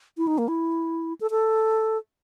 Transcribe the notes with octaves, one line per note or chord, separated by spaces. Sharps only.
E4
D#4
A#3
E4
A4
A4